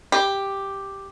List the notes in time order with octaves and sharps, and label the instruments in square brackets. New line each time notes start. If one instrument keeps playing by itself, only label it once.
[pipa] G4